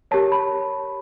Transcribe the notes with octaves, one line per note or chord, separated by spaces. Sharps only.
G4 A#4 C#5 A5
B5